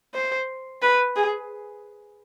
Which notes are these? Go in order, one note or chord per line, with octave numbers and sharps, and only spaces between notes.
C5
B4
G#4